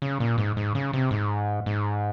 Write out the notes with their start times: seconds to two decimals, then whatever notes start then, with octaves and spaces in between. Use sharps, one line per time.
0.02 C#3
0.20 A#2
0.38 G#2
0.57 G#2
0.75 C#3
0.93 C3
1.11 G#2
1.66 G#2